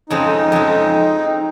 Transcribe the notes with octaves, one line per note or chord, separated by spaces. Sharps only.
F2 C#3 G#3 C4 D#4
F2 C#3 G#3